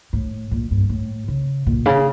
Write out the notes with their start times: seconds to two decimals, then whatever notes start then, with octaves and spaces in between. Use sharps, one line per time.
0.13 A2
0.51 A#2
0.71 G2
0.90 A2
1.28 C#3
1.66 A#2
1.86 C#3